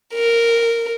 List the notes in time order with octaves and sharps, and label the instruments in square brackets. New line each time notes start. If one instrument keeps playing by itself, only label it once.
[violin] A#4